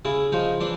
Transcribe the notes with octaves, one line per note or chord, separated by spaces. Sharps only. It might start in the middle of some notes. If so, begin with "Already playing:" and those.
C#3 E4
F3 D#4
E3 D4